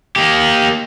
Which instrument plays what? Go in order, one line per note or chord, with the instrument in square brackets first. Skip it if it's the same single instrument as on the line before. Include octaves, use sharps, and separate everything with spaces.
[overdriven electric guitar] A#3 G4